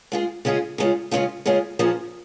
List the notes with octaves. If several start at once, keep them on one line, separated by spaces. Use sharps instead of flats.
G#3 F4 G#4
C#3 G#3 C#4 F4 G#4
C#3 G#3 C#4 F4 G#4
C#3 G#3 C#4 F4 G#4
C#3 G#3 C#4 F4 G#4
A#2 F3 C#4 G#4